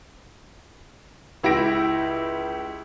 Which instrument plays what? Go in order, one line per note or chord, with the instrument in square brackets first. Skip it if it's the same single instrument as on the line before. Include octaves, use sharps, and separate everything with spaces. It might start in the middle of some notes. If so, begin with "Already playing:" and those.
[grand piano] C#2 E4 G4 A#6 D7